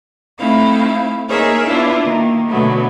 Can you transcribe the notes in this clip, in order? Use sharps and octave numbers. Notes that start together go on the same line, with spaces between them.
A3 C4 D#4 E4 F5
A#3 D#4 G#4 A#4 C#5 E5
B3 D4 E4 F4
D#3 A#3
B2 D3 F#3 A3 B3